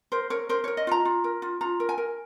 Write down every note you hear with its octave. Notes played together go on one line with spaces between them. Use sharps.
A#4 C5
A#4 C#5
A#4 C5
A#4 C#5
D#5
F4 A#5
F4
A#4
F4
F4 A#5
A#4
G#5
A#4